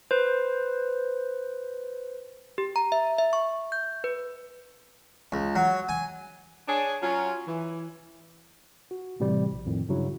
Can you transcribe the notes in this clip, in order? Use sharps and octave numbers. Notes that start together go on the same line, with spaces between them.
B4 C5
G4
A#5
E5
E5
C#6
G6
B4
C#2
F#3
G#5
D4 G#4 C#5
F#3 C#4 F4
E3
F#4
A2 C3 E3 G3
A#1
F2 A2 D#3
G2 C#3 F#3 E4